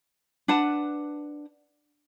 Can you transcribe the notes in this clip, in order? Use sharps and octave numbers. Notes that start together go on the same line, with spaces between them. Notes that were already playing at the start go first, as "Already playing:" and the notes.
D4 B4 F#5 A5